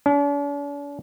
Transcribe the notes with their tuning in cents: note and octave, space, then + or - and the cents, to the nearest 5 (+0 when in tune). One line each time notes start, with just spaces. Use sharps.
D4 -45